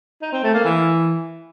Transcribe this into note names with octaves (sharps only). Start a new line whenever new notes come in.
D#4
C4
A3
A#3
E3